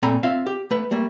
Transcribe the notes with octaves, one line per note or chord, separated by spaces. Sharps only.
A#2 A3 C4 G#5 A#5 B5
C4 F4 E5 F5
G4
A3 B4
G3 A3 A#3